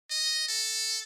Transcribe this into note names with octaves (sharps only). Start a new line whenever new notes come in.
D#5
A4